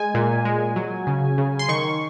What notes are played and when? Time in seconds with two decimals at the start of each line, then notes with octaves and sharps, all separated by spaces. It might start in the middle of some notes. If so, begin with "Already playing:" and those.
Already playing: G#3 G#5
0.14 A#2
0.45 G#3
0.76 F#3
1.07 C#3
1.38 C#3
1.59 C6
1.68 D#3 C#6